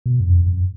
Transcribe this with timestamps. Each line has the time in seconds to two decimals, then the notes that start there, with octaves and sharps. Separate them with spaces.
0.06 B2
0.20 F#2
0.26 F2
0.46 F#2